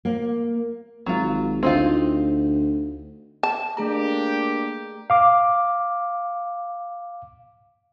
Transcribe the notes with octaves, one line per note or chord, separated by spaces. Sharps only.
A#3
G#1 F#3 F4
D2 C4 D#4 F4
A5
A3 A#3 D4 G4 G#4 A#5
F5 D6